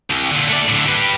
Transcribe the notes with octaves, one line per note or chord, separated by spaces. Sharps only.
C2
A#2 D3
A3 D5
A2 D3
G4 B4